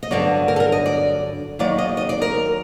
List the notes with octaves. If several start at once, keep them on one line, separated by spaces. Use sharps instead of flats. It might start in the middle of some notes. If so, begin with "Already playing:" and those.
D#5
G2 D3 F#3 D5
A#4
A4
A#4
D#5
D5
D#2 D#3 F#3 D5
D#5
D#5
D5
A#4